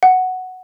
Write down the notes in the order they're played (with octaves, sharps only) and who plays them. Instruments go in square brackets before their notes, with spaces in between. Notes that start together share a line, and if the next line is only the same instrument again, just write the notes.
[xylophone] F#5